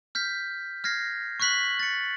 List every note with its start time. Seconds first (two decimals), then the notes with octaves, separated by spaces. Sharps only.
0.15 F6 G6 B6
0.84 F6 G#6 A#6 C7
1.40 C#6 F6 F#6 B6 F#7
1.79 A6 C#7